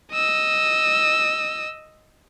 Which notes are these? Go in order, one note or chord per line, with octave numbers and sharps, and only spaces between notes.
D#5 E6